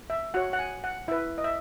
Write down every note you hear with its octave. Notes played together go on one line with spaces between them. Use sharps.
E5
F#4 C#5 F#5
F#5
G#5
F#5
E4 B4 E5
D#5
E5